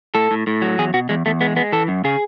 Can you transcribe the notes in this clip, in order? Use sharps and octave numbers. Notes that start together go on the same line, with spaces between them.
A2 A4
A2
A2
F#3
E2 G#4
B2 F#4
E2 G#3
E2 A3
G#3 B3
G#3 B3
E3 A4
F#2
C#3 G#4